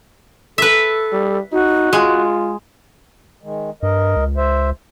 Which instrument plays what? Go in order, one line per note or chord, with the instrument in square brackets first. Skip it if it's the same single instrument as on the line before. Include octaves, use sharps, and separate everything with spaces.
[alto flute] A4 [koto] B4 E5
[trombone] G3
[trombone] D#4 [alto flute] F#4
[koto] G#3 [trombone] F4
[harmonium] D#3 G#3
[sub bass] G2 [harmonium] A#4 D#5
[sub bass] C#2
[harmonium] C5 E5